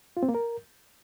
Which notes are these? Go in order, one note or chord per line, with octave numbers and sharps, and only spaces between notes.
F4
C4
A#3
A#4